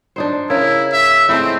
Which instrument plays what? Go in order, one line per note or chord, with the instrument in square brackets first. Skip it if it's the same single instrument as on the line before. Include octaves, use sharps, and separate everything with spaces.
[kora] D4 D#4 C5
[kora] C#3 A#4 [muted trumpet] E4
[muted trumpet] E5
[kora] G#3 A3 E4 [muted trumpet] C4